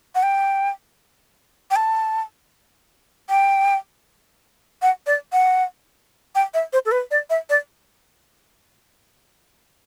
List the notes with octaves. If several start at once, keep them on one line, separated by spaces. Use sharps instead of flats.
F#5
G5
G5
A5
G5
F#5
D5
F#5
G5
E5
C5
A4
B4
D5
E5
D5